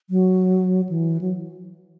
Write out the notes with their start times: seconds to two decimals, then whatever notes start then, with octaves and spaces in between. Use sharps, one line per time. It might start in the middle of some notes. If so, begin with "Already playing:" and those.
0.10 F#3
0.89 E3
1.21 F#3